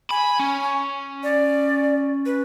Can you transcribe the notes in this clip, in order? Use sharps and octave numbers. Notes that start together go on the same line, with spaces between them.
G#5 B5
C#4
D5
B4